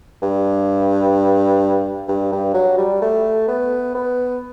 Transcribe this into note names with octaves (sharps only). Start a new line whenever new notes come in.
G2
G2
G2
F#3
G3
A3
B3
B3